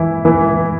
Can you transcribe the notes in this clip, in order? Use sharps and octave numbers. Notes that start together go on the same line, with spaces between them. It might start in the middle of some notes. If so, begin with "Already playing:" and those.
Already playing: E3 E4
E3